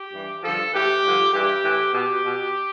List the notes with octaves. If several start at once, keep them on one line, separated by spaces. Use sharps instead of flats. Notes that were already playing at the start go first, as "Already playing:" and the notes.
Already playing: G4
G2 E3
G2 D3 F3 A4
A2 E3 G4
G2 D3 F3
G2 E3 G4
A2 E3
B2 G4
B2